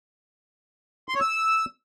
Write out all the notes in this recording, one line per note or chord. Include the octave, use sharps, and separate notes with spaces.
C6
C#5
E6